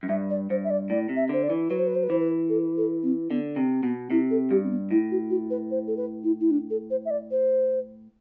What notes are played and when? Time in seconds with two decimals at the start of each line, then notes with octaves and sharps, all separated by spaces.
0.03 F#2
0.09 G2 E5
0.30 D5
0.50 G2 C5
0.64 E5
0.70 D5
0.90 A2 D5
1.09 C3
1.16 E5
1.29 D3 C5
1.43 D5
1.50 E3
1.70 F#3 B4
1.79 C5
1.87 B4
1.95 C5
2.03 B4
2.10 E3 C5
2.19 B4
2.49 A4
2.77 A4
3.03 C4
3.30 D3 B3
3.56 C3 C4
3.83 B2 B3
4.10 C3 E4
4.30 A4
4.51 G2 G4
4.64 C4
4.70 B3
4.91 A2 E4
5.11 F#4
5.30 F#4
5.50 B4
5.71 C5
5.87 A4
5.97 B4
6.24 E4
6.40 E4
6.51 D4
6.70 A4
6.90 C5
7.05 E5
7.10 D5
7.31 C5